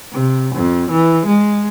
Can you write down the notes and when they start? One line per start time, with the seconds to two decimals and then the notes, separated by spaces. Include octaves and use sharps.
0.12 C3
0.56 F2
0.91 E3
1.27 G#3